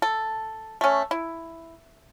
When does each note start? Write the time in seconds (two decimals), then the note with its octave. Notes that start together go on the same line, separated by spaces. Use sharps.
0.02 A4
0.81 A3 C#4
1.11 E4